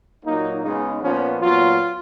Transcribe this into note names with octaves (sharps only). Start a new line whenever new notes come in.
A#2 F#3 A#3 D#4
C#3 G#3 B3 D#4
A#2 F3 B3 C#4
A#2 F#3 B3 F4